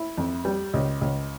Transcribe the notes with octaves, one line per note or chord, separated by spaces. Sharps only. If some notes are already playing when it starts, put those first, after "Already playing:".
Already playing: E4
F2
G3
C#2
C#2